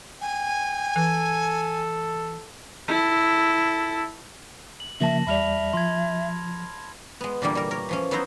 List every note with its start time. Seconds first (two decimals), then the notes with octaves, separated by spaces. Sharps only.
0.21 G5 G#5
0.96 E3 A4
2.88 E4 A4
4.80 F#7
5.00 C#3 F3 A#3 E5 A5 A#6 F#7
5.27 E2 G3 D5 E5 B5 F6 F7
5.73 F3 C6 G#6
7.21 G#3 B3
7.42 A#2 D3 E3 G3 A#3
7.55 G3 A#4
7.71 A#4 C#5
7.89 E3 F3 C#4
8.11 F#3 B3 D#4 E4 C5 A#5